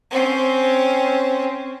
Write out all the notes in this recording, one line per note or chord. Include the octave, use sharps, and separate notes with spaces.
C4 C#4